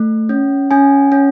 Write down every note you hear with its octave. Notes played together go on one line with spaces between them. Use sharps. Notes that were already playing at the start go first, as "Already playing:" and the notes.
Already playing: A3
C#4
C#4 G#5
C#4